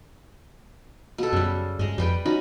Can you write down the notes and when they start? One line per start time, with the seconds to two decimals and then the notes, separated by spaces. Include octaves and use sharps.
1.18 B2 A4
1.33 F#2 C#3 G3
1.79 G2 G#3 D#5
1.98 F2 G3 B4 G5
2.26 C#4 D#4 F#4 B5